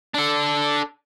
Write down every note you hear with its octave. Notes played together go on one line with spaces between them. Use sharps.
D4 A4